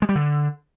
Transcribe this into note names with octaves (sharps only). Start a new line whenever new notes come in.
G#3
G3
D3